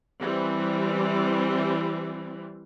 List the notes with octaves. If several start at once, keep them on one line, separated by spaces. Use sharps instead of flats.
E3 G3 C4